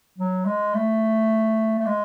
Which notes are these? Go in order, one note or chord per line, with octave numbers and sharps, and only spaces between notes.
F#3
G#3
A3
A3
G#3